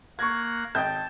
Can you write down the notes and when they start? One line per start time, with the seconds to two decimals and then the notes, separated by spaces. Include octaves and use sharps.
0.19 A#3 C#6 F#6 G#6 A#6
0.75 G#1 D#5 G5 A5 G6